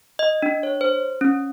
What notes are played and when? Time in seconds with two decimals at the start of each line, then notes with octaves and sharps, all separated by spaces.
0.19 D#5
0.42 D4
0.63 C#5
0.81 C5
1.21 C#4